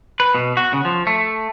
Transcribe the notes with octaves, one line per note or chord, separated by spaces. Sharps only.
B4
B2
F#4
C#3
F3
A3